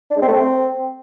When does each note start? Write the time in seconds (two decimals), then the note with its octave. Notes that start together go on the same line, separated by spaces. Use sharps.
0.11 D4
0.16 G#3
0.22 C4
0.28 A3
0.34 C4